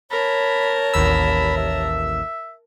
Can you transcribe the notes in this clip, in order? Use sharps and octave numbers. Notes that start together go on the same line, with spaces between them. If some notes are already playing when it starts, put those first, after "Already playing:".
A#4 C#5 A5 B5
A1 D#2 B5 E6
E5